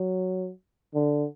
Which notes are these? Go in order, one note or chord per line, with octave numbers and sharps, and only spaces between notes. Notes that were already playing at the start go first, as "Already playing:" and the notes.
Already playing: F#3
D3